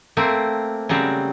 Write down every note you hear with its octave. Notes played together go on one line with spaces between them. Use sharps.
A3 A#3 C4
C#3 F#3 G3 C4